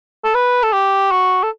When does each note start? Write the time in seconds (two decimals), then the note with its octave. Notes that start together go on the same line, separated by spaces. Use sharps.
0.24 A4
0.35 B4
0.63 A4
0.73 G4
1.11 F#4
1.43 A4